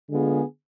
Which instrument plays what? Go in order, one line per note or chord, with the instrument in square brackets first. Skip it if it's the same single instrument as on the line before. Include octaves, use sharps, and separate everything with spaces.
[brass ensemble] D3 G#3 B3 F4 G#4